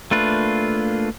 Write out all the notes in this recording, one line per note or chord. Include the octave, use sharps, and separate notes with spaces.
A3 A#3 D4 F4 B4